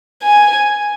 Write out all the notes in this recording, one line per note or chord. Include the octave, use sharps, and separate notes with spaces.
G#5